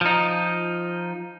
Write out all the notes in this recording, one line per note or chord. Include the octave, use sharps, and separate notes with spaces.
F3 D#4